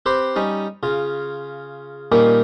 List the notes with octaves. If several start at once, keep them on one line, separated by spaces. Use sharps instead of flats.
C4 G4 B4 C5 C6
G3 C#4 D#4
C#3 F4
A#2 D#3 G3 A#3 C#4